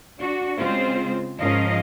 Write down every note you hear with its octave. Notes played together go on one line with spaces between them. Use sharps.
D4 F#4
C#3 G#3 C4 F4 C5
G#2 F3 C#4 A#4 D#5 F5